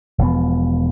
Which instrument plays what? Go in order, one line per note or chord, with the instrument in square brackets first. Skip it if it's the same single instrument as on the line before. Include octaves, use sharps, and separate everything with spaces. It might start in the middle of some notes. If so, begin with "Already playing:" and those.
[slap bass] E1 F3 B3